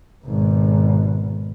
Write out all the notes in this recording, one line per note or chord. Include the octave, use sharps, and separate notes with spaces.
G#1 B2